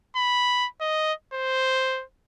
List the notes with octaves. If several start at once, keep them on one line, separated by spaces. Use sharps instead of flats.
B5
D#5
C5